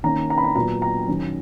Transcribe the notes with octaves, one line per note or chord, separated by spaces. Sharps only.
D#3 A#3 C#4 A#5
A#5
B5
A#5
A#2 F#3 B3 A#5
A#5
D#3 F#3 C#4